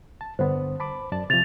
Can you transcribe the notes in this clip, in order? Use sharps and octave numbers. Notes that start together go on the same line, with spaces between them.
A5
G2 D3 B3 C5
A5 B5 D6
F#2 D5 A5
C3 F3 A6 F7